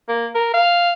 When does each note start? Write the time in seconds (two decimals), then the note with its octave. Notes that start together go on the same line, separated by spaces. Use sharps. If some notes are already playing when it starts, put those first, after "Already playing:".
0.09 A#3
0.35 A#4
0.54 F5